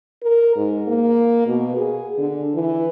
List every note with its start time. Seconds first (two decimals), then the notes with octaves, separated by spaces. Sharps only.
0.23 A#4
0.56 G#2
0.88 A#3
1.47 B2
1.77 G#4
2.18 D3
2.54 E3